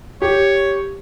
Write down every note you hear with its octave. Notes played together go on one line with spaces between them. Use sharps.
G4 C#5